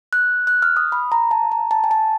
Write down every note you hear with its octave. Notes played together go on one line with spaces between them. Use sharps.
F#6
F#6
F6
D#6
B5
A#5
A5
A#5
A5
G#5
A5